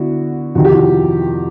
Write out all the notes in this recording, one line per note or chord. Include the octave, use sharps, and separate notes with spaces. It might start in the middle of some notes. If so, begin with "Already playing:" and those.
Already playing: D3 B3 E4 F#4
F2 C3 D#3 F#4
G4
E4 F#4